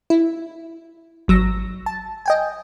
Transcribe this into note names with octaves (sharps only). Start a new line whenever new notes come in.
E4
G#1 F#3 E6 A#6
A5
D#5 G5 G#5